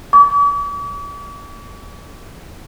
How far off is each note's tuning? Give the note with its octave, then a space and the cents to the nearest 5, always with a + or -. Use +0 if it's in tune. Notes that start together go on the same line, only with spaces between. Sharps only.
D6 -45